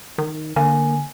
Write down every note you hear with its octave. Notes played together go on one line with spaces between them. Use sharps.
D#3
D3 A#3 G#5